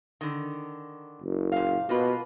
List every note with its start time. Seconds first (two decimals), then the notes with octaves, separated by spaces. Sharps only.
0.21 D3 D#3
1.22 F#1
1.52 A#2 F5
1.89 B2 A#3 F4 B4